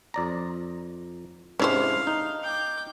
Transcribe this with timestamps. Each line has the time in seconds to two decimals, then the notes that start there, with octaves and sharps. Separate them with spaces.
0.14 F2 D5 A#5
1.59 G#2 C3 C#4 D4 E4 C5 F5
2.07 D#4
2.43 G5 D6